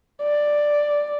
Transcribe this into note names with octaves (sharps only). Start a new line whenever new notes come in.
D5